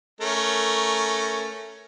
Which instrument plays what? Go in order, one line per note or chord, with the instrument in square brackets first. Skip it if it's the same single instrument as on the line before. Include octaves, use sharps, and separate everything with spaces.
[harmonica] A3 C#4 A#4